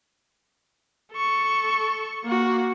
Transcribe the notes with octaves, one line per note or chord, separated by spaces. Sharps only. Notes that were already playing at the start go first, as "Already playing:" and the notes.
A4 C#6
A#3 F#4